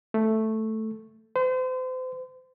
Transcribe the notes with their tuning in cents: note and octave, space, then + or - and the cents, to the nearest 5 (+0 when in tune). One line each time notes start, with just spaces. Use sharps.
A3 +0
C5 -35